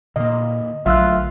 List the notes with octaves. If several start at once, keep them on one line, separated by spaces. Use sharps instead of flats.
A#2 D3 A#3 D#5
A#1 D3 F#3 A3 F4 E5 E6 F#6